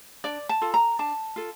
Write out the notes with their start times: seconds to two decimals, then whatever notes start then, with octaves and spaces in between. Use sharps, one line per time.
0.24 D4 D5
0.49 A5
0.62 F4 A4
0.74 A#5
0.99 D4 A5
1.36 F4 A4